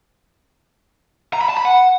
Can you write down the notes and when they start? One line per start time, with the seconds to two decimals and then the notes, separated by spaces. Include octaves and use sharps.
1.33 A#5
1.41 B5
1.49 A5
1.57 B5
1.65 F#5